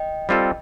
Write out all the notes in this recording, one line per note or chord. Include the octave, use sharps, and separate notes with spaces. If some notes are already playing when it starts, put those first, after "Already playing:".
Already playing: D#5 G5
G3 C4 F4 A4